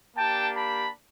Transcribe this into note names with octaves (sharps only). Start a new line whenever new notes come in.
A#3 D4 G4 G5 A5
A5 B5